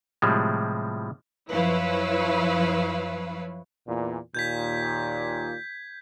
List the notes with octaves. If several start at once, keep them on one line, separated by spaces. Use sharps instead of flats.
A2 C3 F3 G3 G#3
F#2 F3 E4 B4 C#5 F5
E2 A#2
D#2 A#2 G6 G#6 B6